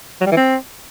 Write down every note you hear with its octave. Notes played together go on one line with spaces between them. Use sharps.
F#3
G3
E3
C4